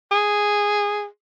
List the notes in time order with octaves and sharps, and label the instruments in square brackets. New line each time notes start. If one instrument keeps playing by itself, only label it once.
[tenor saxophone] G#4